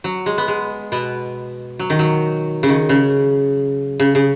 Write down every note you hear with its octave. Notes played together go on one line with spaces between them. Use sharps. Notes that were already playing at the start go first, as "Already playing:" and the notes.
F#3
G#3
B3
G#3
B2 B3
F#3
D#3
F#3
C#3
D#3
C#3
C#3
C#3